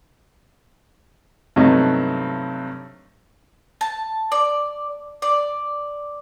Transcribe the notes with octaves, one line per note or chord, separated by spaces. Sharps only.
G2 C3 F#3 A3 B3 D#4
A5
D5
D5